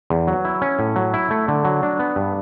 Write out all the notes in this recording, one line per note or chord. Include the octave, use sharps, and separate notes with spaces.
E2
F#3
E4
C#4
A2
F#3
E4
A3
D3
F#3
D4
B3
G2